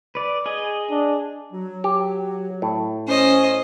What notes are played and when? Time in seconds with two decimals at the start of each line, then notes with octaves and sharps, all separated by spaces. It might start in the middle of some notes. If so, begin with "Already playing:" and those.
0.15 B4 D5
0.46 G#4 D#5
0.90 D4
1.53 F#3
1.84 G4
2.62 A2
3.08 C#4 C5 D#5